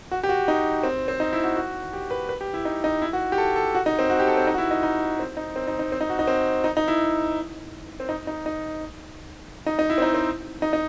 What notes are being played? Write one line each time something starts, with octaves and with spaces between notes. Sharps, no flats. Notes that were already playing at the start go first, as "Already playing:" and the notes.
F#4
G4
F#4
D#4
C4
C4
D#4
E4
F#4
F#4
G4
B4
B4
G4
E4
D#4
D#4
E4
F#4
G4
A4
A4
F#4
D#4
C4
F#4
G4
A4
C4
D#4
F#4
E4
D#4
D#4
C4
D#4
C4
D#4
D#4
C4
D#4
F#4
D#4
C4
D#4
D#4
E4
C4
D#4
D#4
D#4
D#4
D#4
E4
C4
D#4
C4
D#4
D#4